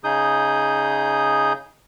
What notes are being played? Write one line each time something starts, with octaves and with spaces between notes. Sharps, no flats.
C#3 D#4 G#4 D#6 G6